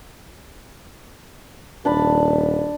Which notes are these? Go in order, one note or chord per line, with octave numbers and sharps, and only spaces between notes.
D#1 D4 A5 B5